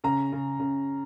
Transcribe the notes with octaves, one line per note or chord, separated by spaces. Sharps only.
C#3 A#5
C#3
C#3